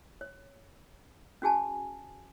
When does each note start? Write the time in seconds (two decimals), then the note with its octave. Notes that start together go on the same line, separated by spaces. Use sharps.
0.21 C#5
1.42 C#4 F#4 G#4 G#5 A5